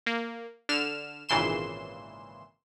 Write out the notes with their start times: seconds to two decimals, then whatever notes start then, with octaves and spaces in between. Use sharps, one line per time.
0.06 A#3
0.69 D3 F6 E7
1.29 G#1 A#2 C#3 E3 C6 E7